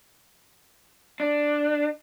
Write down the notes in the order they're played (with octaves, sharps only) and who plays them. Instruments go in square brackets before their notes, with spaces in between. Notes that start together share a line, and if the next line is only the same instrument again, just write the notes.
[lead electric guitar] D4